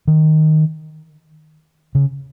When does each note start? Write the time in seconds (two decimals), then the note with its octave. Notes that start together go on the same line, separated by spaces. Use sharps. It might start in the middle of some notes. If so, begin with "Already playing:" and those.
0.07 D#3
1.95 C#3